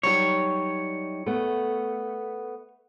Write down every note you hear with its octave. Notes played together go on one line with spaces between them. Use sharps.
F#3 G3 D#4 C#5
A3 B3